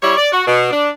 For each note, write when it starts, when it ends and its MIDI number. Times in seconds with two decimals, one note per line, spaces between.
0.03 0.17 55
0.03 0.17 64
0.03 0.17 73
0.17 0.30 74
0.32 0.43 66
0.46 0.69 47
0.71 0.89 62